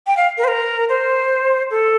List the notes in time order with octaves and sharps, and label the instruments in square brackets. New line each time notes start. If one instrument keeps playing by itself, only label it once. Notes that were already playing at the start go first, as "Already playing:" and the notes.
[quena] G5
F5
A#4
C5
A#4
C5
A4